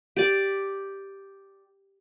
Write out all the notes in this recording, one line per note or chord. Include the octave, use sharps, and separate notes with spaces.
G4 D5